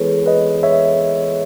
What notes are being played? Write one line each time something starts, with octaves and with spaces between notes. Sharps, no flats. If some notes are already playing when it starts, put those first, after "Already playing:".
Already playing: E3 G#3 B3 E4 G#4 A4 B4 C#5
B4 D#5
C#5 E5